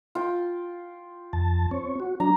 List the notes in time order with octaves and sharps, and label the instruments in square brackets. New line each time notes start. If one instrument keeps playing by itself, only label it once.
[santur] F4 G5
[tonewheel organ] F2 A5
C4 C#5
F#4
[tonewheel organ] F#3 D4 [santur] A#5